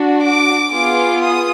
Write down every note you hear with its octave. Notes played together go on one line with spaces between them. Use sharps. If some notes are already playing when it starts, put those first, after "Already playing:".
Already playing: D4 F#4
D6
B3 F4 G#4 D6
D#6